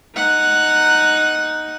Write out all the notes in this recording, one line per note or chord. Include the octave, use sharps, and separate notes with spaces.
D#4 F#5